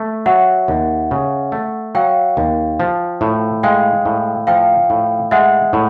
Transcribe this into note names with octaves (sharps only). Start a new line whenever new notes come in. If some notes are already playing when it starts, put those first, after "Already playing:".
Already playing: A3
F#3 E5 F#5
D#2
C#3
A3
F#3 F5 G5
D#2
F3
A2
G#3 F5 G5
A2
F3 F5 G5
A2
G#3 E5 F#5
A2